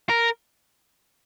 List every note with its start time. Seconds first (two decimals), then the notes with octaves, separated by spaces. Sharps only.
0.09 A#4